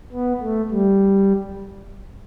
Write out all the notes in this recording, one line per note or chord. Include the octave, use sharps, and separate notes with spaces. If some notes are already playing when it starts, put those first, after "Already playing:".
B3
A3
G3